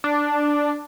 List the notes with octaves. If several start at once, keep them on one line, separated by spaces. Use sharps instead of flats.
D4